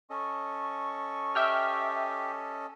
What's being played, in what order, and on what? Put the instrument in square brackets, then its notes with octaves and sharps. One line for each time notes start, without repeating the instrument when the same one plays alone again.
[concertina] C#4 A4 D#5 [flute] C#6
[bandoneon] G4 [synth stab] E5 G5 F6